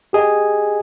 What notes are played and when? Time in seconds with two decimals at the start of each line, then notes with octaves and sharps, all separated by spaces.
0.13 G4 G#4 D#5 G#5